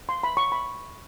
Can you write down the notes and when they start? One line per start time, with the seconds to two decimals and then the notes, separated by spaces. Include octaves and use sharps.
0.09 C6
0.23 B5
0.37 C#6
0.52 B5